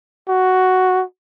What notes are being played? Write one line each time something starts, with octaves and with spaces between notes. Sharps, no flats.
F#4